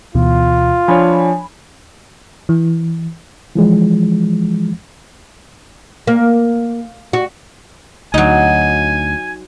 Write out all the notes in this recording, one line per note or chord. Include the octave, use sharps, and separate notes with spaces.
D2 B2 E3 F4
F3 D4 C#5 G#5 B5
E3
E3 F3 G#3
A#3
F#4
D2 F#3 D#4 G#5